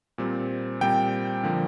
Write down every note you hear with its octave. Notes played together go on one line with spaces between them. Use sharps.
A#2 G3 C4
A#2 G3 C4 G5
D3 F3 A#3